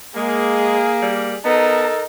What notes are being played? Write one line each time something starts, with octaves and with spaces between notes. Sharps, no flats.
G#3 A#3 G#4
G3
B3 D#4 A4 A#4 A5